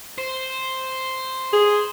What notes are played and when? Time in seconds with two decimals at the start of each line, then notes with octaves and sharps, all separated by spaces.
0.18 C5
1.53 G#4